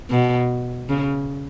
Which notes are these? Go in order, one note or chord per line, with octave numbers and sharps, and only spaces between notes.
B2
C#3